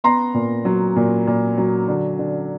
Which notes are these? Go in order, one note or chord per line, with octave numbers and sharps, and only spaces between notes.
B3 A#5 C6
A#2
F#3
A#2
A#2
F#3
D3
D3